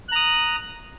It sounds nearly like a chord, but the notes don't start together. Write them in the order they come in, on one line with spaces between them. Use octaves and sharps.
F#6 A#5 D#6